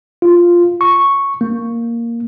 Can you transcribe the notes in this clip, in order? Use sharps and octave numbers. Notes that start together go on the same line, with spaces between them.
F4
C#6
A#3